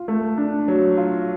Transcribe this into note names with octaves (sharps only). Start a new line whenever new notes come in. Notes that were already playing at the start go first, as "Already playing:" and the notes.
Already playing: F4
A3
D4
F#3
F4